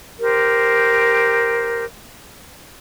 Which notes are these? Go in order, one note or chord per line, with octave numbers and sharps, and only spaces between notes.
G4 A#4 C5